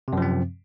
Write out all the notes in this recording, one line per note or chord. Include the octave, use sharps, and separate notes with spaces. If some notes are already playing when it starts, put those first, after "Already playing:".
F#2 C3 F3 C4